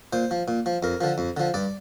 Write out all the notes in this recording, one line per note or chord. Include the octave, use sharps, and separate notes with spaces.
A#2 C5
F3
A#2
F3
F2 A#4
D3 F3
F2
D3 F3
G2 D5